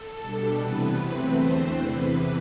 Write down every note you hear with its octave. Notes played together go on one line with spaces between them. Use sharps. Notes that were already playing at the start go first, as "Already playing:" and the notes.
Already playing: A4
B2 G3 D4
C3 E3 B3 B4
E2 C3 F#3 A3 C4
E2 D3 A3 C4 C5
E2 C3 E3 B4